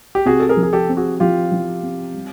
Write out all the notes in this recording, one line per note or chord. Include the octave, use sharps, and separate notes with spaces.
G4
C3 F#4 G#4
A4
G#4 A#4
F3
G#4
G4 A4
C4
F#4 G#4
F3 F4 G4
F3
C4
G3